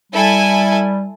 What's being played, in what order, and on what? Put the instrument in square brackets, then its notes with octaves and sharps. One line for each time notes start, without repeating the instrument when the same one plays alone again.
[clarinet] G3 [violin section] E4 A4 G#5